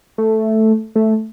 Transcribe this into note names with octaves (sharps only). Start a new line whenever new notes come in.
A3
A3